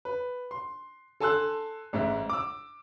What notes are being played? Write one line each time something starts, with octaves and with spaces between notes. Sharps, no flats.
B4
C6
A4 G#5 A5 C6 E6 F#6
A1 G#2 E5
D6 E6